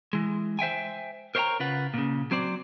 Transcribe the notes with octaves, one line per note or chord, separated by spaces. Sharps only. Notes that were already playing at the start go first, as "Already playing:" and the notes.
E3 G#3
C5 E5 G5 G#5
A#4 C5 C#5 D#5 G5 A#5
C#3 F4 B4 F#5
A#2 C#3
F#3 C4 C5 D5